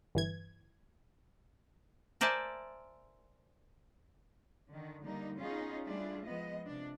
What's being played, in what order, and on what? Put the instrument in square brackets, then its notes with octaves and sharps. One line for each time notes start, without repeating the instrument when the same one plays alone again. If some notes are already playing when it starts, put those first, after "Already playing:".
[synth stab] G1 E3 G#6
[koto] A#4 C5 D5 E5 G#5 A5
[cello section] D3 D#3
D3 G3 A#3 D#4
B3 C#4 D#4 F4 G#4
G3 A3 D4 E4 F4 G#4
F3 G#3 B3 D#5
C3 F3 D4